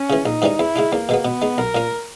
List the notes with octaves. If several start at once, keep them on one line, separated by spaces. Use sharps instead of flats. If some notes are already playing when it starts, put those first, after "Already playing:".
Already playing: C#4
C#3 E3
A#1 D#4
G#2 E3 G3 C#4
E2 E4
C#3 G#3 D#4
E2 A#3
B2 G#3 B3
B2 B3
G#3 D#4
B1 A#4
A#2 A#3 C#4